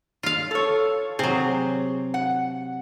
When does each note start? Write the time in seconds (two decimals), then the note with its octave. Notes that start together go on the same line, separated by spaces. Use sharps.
0.23 F4 F5
0.51 A4 C#5
1.19 C3 F#3 G#4
2.14 F#5